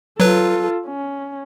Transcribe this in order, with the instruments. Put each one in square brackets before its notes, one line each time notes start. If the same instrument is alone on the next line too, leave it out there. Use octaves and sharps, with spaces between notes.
[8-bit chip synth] F#3 B4 [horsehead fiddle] F4 A4
[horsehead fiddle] C#4